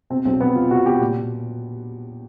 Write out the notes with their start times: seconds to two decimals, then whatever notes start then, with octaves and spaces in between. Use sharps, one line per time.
0.10 B2 C4
0.25 B1 C4
0.41 B1 B3
0.56 B2 F4
0.71 B2 F#4
0.86 B2 G4
1.01 A#2
1.16 A#2